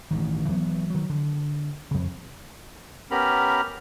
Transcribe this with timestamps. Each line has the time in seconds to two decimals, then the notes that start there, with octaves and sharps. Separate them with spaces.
0.11 A1 G2 D#3
0.48 E3 F#3 A3 B3
0.90 D#3 F#3
1.10 D3
1.91 F2 C#3
3.11 B3 C#4 G4 A#4 A#5 B5